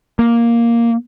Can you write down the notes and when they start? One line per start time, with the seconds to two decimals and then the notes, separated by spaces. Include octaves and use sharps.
0.19 A#3